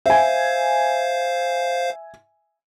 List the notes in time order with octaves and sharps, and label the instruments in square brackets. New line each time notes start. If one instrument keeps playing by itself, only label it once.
[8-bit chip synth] C5 F5 [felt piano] E5 G#5